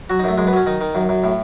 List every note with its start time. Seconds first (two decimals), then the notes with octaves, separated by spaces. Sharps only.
0.10 F#3 F#4
0.19 D#4
0.24 F#2 A3
0.38 F#2 G#3
0.47 B3
0.53 F#3 C#4
0.66 D#3 D#4
0.81 D#3
0.95 F#2
1.09 F#2
1.24 A2